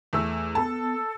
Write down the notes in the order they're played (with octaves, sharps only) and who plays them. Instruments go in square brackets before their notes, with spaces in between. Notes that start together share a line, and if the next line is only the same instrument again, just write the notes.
[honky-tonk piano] E2 A3 E6
[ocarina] B3 [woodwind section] A4 [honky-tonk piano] A5